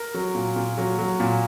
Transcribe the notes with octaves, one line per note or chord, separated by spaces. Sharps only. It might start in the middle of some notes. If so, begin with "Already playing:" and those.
Already playing: A#4
F#3
A#2
A#2
F#3
F#3
A#2